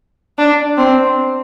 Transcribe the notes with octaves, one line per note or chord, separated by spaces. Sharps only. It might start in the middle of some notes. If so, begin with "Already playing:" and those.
D4
C4